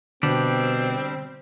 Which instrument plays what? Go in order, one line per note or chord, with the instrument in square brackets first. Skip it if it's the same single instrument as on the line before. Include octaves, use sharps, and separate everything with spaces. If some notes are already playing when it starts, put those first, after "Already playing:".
[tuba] B2 [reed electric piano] D3 [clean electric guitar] G3 D4 [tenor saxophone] C4